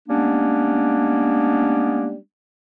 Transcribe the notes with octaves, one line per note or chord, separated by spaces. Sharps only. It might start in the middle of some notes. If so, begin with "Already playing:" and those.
G3 G#3 A#3 B3 C#4 D4